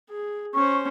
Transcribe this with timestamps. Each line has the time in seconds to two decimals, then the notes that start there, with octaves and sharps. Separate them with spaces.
0.10 G#4
0.54 C#4 C5 C#6